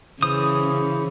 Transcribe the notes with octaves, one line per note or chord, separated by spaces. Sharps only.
C#3 E3 C5 D#6